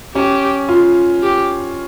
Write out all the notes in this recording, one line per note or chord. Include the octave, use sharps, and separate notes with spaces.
C#4 G4
F4
G4